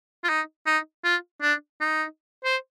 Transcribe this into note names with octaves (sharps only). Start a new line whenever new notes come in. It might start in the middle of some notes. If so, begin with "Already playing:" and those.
F4
D#4
D#4
F4
D4
D#4
C5